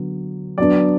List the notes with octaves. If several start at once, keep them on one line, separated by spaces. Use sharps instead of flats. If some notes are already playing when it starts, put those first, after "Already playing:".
Already playing: D3 F#3 B3
F#3 B3 D4 D5